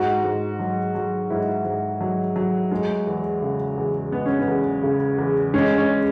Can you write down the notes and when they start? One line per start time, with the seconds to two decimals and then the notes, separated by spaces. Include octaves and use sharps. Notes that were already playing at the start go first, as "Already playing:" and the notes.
Already playing: G#2 F#4
0.24 G#2
0.59 F#3
0.95 F#3
1.30 G#2 E4
1.65 G#2
2.00 F#3
2.36 F#3
2.71 G#3
3.07 E2
3.42 C#3
3.77 E2
4.12 G#3 B3
4.26 C#4
4.39 B3
4.48 E2
4.83 C#3
5.18 E2
5.54 G#3 C#4
5.78 C#4